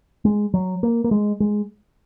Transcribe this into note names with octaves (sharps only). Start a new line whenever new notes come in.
G#3
F#3
A#3
A#3
G#3
G#3